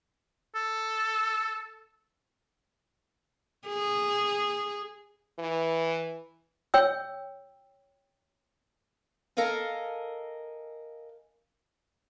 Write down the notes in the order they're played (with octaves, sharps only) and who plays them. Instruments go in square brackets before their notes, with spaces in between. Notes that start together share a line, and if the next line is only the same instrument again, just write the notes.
[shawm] A4
[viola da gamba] G#4
[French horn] E3
[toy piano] C#5 G5 E6
[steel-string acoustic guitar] A4 A#4 D#5 F5 G#5